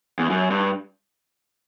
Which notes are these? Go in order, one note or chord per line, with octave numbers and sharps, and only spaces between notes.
E2
F#2
G2